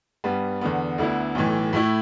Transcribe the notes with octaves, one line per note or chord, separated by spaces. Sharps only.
G2 G3 B3
E2 D3 B3
D2 D3 B3 E4
B1 A2 E3
A2 A3 E4